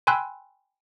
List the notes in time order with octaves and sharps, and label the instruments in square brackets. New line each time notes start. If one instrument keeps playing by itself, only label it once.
[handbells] G5 G#5 B5 C6 E6 F#6